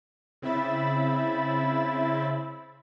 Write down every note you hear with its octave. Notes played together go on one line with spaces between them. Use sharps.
C#3 C4 E4 E5 B5 A6